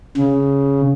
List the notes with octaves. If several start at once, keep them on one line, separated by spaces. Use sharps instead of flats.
C#3